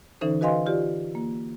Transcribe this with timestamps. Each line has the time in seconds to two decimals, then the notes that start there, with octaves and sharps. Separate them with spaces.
0.21 D3 E3 C#4 D#4 A4 C5
0.41 F#4 B4 D#5 F5 G#5 C6
0.66 F4 G4 D5
1.15 A#3